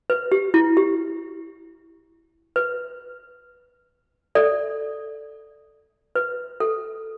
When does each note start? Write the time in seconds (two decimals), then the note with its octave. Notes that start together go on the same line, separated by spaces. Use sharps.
0.10 B4
0.32 G4
0.54 E4
0.77 G4
2.56 B4
4.35 A4 D5
6.15 B4
6.60 A4